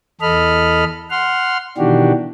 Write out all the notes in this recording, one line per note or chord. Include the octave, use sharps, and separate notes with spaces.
E2 A4 D#5 B5 F6
F#5 C6 F6
B2 D#3 E3 D4 F#4 G4